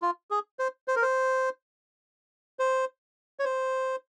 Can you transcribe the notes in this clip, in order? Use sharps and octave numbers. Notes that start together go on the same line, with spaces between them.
F4
G#4
C5
C5
A#4
C5
C5
C#5
C5